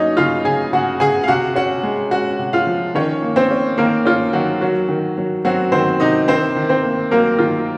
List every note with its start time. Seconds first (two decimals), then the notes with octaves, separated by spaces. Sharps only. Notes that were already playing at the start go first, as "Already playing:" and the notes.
Already playing: F#3 A#3 C#4 D#4 C#5 D#5
0.17 C#3 F4 F5
0.45 C#3 G#4 G#5
0.73 C#3 F#4 F#5
1.00 C#3 G#4 G#5
1.24 F5
1.28 C3 F#4 F#5
1.56 C#4 F#4 F#5
1.83 G#3
2.11 C#4 F#4 F#5
2.39 C3
2.53 F4 F5
2.67 F3
2.95 D#3 C#4 C#5
3.22 A#3
3.36 C4 C5
3.51 C#4
3.78 D#3 A#3 A#4
4.05 C#4 F4
4.33 D#3 F#3 F#4
4.61 F#3 F#4
4.89 D#3
5.18 F#3
5.45 F#3 C4 F#4
5.72 D#3 C4 C5
6.00 C3 D#4 D#5
6.28 D#3 C4 C5
6.56 D#3
6.69 C4 C5
6.83 A#3
7.11 F#3 A#3 A#4
7.39 D#3 F4